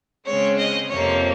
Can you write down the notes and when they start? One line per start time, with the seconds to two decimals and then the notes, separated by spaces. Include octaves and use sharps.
0.26 C#3 G#3 C4 C#5
0.58 D#5
0.90 F2 C3 F3 A#3 C#5